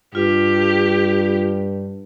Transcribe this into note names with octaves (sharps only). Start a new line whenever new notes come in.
G2 F4 G4